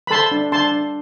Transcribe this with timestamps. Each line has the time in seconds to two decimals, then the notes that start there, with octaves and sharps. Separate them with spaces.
0.07 B5
0.11 A4 A5 C6
0.32 D4
0.52 D4 A5 C6
0.72 D4